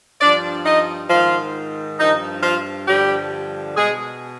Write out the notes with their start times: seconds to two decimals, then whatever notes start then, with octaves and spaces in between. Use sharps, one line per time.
0.20 G2 F3 D4 D5
0.65 D#4 D#5
1.09 G#2 D#3 F3 F4
1.98 G2 D#3 F3 D#4
2.42 F3 F4
2.87 G2 D3 F3 G3 G4
3.76 B2 G#3 G#4